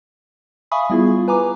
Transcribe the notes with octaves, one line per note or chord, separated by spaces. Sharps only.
E5 F5 G#5 B5 C#6 D#6
G3 B3 E4 F4 G#4
B4 G#5 A#5 D6